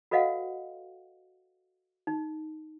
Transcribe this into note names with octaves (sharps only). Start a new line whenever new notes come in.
F#4 A4 B4 D#5 F5 F#5
D#4